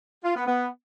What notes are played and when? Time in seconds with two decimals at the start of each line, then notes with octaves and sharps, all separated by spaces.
0.24 F4
0.36 B3
0.47 B3